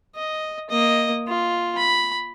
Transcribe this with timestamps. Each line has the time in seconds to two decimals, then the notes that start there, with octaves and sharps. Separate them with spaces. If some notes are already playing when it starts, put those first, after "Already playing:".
0.15 D#5
0.70 A#3 D#5
1.27 F4
1.77 B5